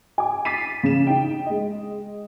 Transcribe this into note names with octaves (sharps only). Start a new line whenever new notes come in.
G#5 D6
D6 A6 B6 C7 D#7
C#3 E7
D#4 G5
G#3 D#5